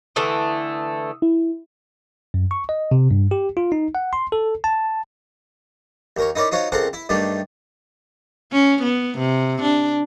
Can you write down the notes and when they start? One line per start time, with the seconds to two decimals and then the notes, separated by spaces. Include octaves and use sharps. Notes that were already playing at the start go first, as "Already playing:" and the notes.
0.16 D3 E3 A3 D#6 E6
1.22 E4
2.34 F#2
2.51 C#6
2.69 D#5
2.91 C3
3.11 G2
3.31 G4
3.57 F4
3.72 D#4
3.95 F#5
4.13 C6
4.32 A4
4.64 A5
6.17 D#2 A#4 C#5
6.35 D#4 E4 A#4 C#5 D5
6.52 D#4 F4 F#4 C5 C#5
6.72 C#2 C4 A4 A#4 C5 F#5
6.93 E4
7.09 G2 D#3 G3 A3 D4
8.52 C#4
8.83 B3
9.18 C3
9.62 D4